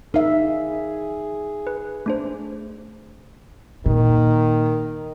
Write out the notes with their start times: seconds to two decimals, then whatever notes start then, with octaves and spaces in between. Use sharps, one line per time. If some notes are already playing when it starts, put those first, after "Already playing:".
0.14 D#4 G#4 A#4 E5 F5
1.67 B4
2.06 A3 D4 C5
3.86 A#2 D#3